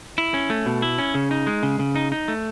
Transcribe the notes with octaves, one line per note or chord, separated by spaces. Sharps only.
E4
C#4
A3
B2
E4
C#4
C#3
D#4
G#3
C#3
C#3
D#4
D#4
A3